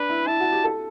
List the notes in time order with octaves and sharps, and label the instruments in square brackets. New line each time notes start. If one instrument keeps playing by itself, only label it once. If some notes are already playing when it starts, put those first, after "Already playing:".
Already playing: [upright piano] D4 [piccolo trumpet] B4
[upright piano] E4
[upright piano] E4 [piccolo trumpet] A5
[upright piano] F#4
G4
A4